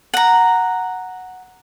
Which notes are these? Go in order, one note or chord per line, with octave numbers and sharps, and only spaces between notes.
F#5 A#5